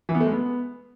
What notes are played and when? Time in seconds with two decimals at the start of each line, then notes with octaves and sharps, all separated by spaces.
0.09 E3
0.15 B3
0.20 A3
0.26 G#3
0.32 B3